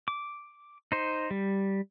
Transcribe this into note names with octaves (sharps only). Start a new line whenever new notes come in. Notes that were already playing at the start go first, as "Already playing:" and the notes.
D6
D#4 C5
G3